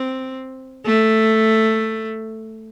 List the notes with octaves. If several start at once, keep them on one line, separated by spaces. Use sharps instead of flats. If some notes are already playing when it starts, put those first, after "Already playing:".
Already playing: C4
A3